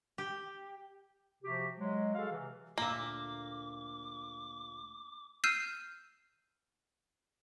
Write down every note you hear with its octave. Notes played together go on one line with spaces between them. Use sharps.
G4
C3 F3 F#4 G4
F#3 G#3
F#4 G#4 A4 F5
C3 E3
D2 A#2 A#3 E5 D6
E6 F6 G6 C7 D#7 E7